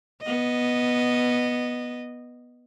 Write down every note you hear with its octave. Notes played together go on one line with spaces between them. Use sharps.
B3 D#5